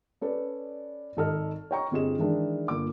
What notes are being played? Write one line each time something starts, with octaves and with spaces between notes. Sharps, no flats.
C#4 A4 B4 D5
G#1 D#4 A4 D#5 F6
C#5 D#5 G5 A#5 C#6
G1 C4 G4 G#4 D#5 E7
D#3 E3 G#3 D4
G1 A#3 D6